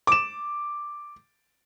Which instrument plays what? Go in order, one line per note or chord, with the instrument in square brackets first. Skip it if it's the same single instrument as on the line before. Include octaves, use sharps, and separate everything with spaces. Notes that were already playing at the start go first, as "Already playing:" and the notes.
[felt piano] D6 E7